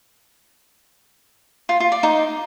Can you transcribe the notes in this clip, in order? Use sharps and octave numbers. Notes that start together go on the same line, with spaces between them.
F4
F4
D5
D#4